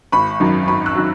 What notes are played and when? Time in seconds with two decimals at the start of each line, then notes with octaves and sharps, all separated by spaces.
0.12 G#1 B5 C#6
0.40 F#2 D#3 F#3
0.68 G#1 B5 C#6
0.86 E6 F#6
0.95 D#3 F#3